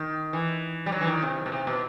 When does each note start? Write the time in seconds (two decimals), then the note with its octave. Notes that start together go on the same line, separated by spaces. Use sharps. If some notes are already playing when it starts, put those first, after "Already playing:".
Already playing: D#3
0.33 E3
0.86 G3
0.92 F#3
1.01 E3
1.07 D#3
1.22 C3
1.46 B2
1.52 C3
1.67 B2